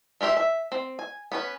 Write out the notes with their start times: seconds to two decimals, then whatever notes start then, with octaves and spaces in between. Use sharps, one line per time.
0.21 G#3 F4 G4 E5
0.37 E5
0.72 C4
0.99 G#5
1.32 B3 C#4 B4